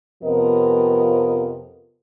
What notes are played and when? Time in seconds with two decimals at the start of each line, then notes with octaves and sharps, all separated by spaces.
0.23 F2 C3 F3 B3 A#4 D#5